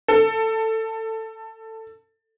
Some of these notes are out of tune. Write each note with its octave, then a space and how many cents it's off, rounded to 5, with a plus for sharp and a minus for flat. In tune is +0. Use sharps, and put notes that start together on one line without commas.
A4 +15